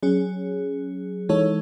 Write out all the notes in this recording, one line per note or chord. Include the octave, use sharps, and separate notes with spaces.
F#3 C#4 G#4
E3 G#3 D#4 A4 C#5